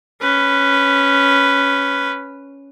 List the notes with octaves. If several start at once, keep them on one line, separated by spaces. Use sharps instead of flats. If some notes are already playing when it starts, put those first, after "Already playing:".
C#4 B4